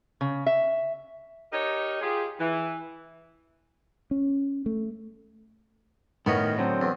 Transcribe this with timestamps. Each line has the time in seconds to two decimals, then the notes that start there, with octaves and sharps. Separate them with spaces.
0.21 C#3
0.46 E5
1.53 D#4 G4 A#4 C#5 D#5
2.02 F4 G4 G#4
2.40 E3
4.11 C#4
4.66 A3
6.26 A2 D#3 B3 C#4 F#4 A#4
6.58 D3 F#3 C4
6.82 E2